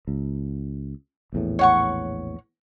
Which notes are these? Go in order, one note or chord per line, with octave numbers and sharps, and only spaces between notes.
C#2
A#1 E2 A2
C#5 F#5 C#6